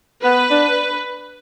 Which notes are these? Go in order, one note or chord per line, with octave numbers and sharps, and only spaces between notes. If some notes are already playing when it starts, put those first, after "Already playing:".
B3 B4
D4